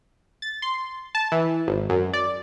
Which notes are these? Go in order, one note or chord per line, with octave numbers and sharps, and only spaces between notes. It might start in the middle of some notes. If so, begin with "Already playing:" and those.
A6
C6
A5
E3
G#1
F#2
D5